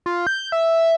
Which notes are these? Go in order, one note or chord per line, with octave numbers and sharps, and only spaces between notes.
F4
G6
E5